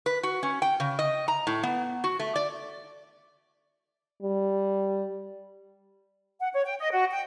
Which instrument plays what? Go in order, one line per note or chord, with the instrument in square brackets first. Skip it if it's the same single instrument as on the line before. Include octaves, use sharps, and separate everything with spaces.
[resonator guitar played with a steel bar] B4
F#4
C#4
G5
C#3
D#5
A#5
A2
B3
F#4
A3
D5
[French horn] G3
[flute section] F#5
C#5
G5
D#5
F#4
G5